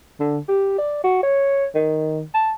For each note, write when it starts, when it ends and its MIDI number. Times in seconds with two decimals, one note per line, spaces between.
0.20 0.38 50
0.48 0.74 67
0.78 1.00 74
1.04 1.22 66
1.23 1.65 73
1.75 2.22 51
2.34 2.51 81